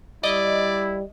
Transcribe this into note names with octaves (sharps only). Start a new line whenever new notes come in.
G3 E4 D5 D#5